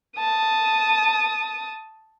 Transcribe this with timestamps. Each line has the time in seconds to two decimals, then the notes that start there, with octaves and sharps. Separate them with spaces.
0.19 A5 D#6